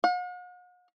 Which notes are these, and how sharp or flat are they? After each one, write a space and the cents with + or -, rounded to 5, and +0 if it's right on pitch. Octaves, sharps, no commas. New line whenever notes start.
F#5 -45